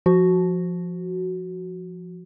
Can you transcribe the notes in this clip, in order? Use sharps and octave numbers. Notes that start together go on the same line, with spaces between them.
F3 F#4